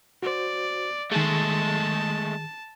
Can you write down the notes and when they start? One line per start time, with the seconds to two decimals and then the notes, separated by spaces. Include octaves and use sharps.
0.23 F#4 C5 D5
1.12 D#3 G#3 A3 G#4 A5